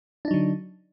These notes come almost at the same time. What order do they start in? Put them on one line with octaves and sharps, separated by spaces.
D4 D#4 F#3 D3